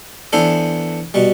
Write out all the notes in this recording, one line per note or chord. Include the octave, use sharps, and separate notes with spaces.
E3 B3 D4 A4 C5
B2 G3